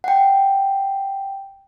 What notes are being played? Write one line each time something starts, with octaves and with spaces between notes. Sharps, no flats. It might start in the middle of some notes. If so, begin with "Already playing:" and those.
F#5 G5